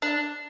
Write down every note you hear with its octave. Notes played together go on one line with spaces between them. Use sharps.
D4